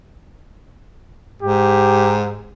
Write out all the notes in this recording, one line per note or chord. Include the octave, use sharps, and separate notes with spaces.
G#2 G4